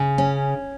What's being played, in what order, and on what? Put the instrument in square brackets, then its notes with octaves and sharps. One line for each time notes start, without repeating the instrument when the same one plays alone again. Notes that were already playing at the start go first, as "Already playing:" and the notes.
Already playing: [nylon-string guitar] C#3
C#4